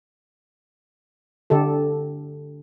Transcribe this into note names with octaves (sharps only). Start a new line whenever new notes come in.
D3 G4 A4